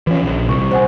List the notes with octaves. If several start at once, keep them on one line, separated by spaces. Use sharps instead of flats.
E3 F3 C#4
A#1
C2 C#6
C5 F#5 G#5